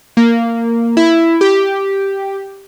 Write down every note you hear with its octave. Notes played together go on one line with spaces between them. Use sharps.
A#3
E4
G4